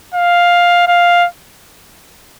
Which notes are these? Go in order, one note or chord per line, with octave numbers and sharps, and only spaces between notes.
F5
F5